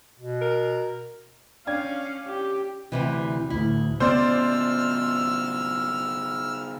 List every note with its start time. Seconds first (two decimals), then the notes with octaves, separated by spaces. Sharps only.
0.20 B2
0.41 A#4
1.67 C#4 D4 C#5 D5 F5 G5 G#6
2.26 G4
2.92 D2 C3 E3
3.50 A1 D2 E4
4.00 C#3 B3 C#4 C5 D5 E6 F6